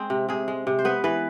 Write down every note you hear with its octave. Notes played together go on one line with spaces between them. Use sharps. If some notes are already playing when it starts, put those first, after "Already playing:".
Already playing: G#3 C4 G#4
C3
C3 G#4
G#3
C3
C5
B3 B4
E3 B4